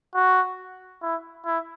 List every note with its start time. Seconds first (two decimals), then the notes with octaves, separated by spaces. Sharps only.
0.14 F#4
1.02 E4
1.45 E4